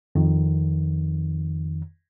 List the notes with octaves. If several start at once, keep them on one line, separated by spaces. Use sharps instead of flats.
F2 D#3